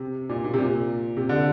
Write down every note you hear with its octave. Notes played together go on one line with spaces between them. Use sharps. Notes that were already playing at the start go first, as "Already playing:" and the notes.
Already playing: C3
A#2
A#2
C3
A#2
C3
D3